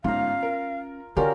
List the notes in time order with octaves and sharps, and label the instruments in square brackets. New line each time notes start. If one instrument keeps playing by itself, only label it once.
[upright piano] G1 G#2 [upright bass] C#4 [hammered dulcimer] F4 A#5 [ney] F5
[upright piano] A#4
[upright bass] D3 [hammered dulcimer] F#3 C#4 F4 [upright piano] G4 D5 [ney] A#4